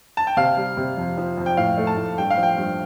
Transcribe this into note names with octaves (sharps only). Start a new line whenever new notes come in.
A5
G5
C3 F5
G3
C3
F2
F3
F2
G5
A2 F5
A3
A5
A2
G2 G5
F5
F3
G5
G2